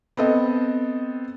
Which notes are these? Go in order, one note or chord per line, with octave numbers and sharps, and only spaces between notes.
B3 C4 A4 D#5